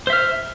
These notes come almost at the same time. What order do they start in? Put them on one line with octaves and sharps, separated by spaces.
C5 E5 F6